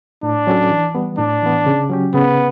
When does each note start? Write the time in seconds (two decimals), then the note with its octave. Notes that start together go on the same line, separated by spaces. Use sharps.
0.23 A2 D4
0.47 F#3 C#4 F#4 A4
0.70 E3
0.95 G3 B3
1.19 A2 D4
1.43 E3 B3
1.66 C#3
1.89 F#3 C#4 G4
2.14 C#3 B3